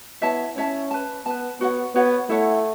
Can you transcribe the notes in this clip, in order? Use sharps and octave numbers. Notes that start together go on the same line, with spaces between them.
B3 E4 C#5 E5 A5
C#4 E4 C#5 E5 A5
B4 A5
B3 B4 A5
B3 F#4 C#5 F#5
B3 F#4 C#5 F#5
A3 E4 A4 C#5 F#5